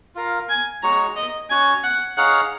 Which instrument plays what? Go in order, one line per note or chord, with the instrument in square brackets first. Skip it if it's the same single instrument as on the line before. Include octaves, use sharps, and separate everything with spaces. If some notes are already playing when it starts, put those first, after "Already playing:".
[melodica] F4 A#4 F5
[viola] G#5
[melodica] G#3 D#4 F#4 C#5 [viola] A#5
[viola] D#5
[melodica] C#4 F#4 C#5 F#5 [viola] G#5
[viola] F#5
[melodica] D#4 G#4 C#5 F5 [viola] F#5